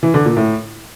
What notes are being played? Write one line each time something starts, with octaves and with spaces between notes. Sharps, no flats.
E3
D3
A#2
A2